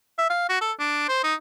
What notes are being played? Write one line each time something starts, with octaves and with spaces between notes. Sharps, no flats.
E5
F5
F#4
A4
D4
C5
D#4